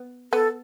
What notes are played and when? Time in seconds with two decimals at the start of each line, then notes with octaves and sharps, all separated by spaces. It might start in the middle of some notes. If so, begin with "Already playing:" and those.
Already playing: B3
0.32 B3 A4